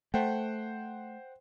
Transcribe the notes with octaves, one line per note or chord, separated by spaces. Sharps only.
A3 C5 F#5 G5